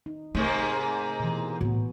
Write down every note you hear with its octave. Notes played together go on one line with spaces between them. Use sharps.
D#4
G#2 C3 A3 A#3
B2 E3
A2 B3 F#4